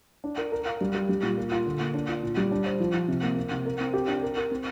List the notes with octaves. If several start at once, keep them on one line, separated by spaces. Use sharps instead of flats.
D4
A#4
A#4
F5
G3
G4
G3
A#2
A#3
F4
D3
A#3
D4
F4
A#2
G3
D4
C5
F3
F3
C3
A#3
A#3
C3
A#4
C4
G4
D4
A#4
A#4
C4